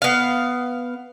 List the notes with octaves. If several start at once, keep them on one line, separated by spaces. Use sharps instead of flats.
B3 F5